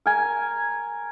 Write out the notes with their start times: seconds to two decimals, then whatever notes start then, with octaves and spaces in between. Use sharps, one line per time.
0.06 A#4 G#5